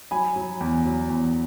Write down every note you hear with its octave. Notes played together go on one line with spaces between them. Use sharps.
F#3 G#5 B5
F#3
E2
F#3
E2